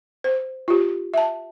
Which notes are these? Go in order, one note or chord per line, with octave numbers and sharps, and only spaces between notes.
C5
F4 G4
E5 A5